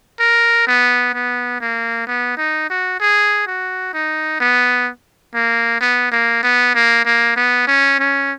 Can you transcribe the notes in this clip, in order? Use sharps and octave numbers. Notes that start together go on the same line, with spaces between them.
A#4
B3
B3
A#3
B3
D#4
F#4
G#4
F#4
D#4
B3
A#3
B3
A#3
B3
A#3
A#3
B3
C#4
C#4